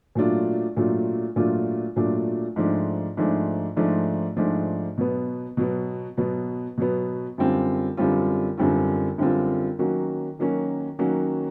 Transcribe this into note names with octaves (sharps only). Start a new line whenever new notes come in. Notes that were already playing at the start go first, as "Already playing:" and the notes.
A#2 F#3 A3 D4 F4
A#2 F#3 A3 D4 F4
A#2 F#3 A3 D4 F4
A#2 F#3 A3 D4 F4
G#2 F3 A3 D4
G#2 F3 A3 D4
G#2 F3 A3 D4
G#2 F3 A3 D4
B2 F#3 B3
B2 F#3 B3
B2 F#3 B3
B2 F#3 B3
F#2 D3 G3 C4 F4
F#2 D3 G3 C4 F4
F#2 D3 G3 C4 F4
F#2 D3 G3 C4 F4
D#3 F#3 A#3 C#4 F#4
D#3 F#3 A#3 C#4 F#4
D#3 F#3 A#3 C#4 F#4